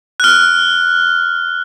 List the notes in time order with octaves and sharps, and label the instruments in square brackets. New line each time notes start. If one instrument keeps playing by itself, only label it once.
[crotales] F6 F#6